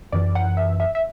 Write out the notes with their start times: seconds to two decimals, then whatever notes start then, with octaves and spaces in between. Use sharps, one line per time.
0.12 F#2 E3 D5
0.35 F#5
0.57 E5
0.80 E5
0.95 E5